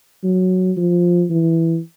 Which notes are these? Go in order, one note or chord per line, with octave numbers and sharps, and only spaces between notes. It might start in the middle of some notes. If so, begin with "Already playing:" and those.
F#3
F3
E3